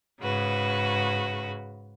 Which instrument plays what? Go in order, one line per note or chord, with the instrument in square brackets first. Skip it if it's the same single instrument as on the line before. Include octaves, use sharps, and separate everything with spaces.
[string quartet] G#2 C#3 F#4 B4